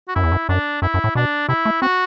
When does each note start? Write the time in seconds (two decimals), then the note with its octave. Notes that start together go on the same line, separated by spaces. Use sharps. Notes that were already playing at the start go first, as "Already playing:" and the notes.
0.08 F#4
0.15 F#2 E4
0.23 E2
0.32 F#2
0.49 F#2 D4
0.82 F#2 E4
0.94 F#2
1.04 A2
1.15 B2 D4
1.49 C3 E4
1.65 A3
1.82 C4 F#4